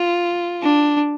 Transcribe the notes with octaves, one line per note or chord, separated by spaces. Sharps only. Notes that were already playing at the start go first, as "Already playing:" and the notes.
Already playing: F4
D4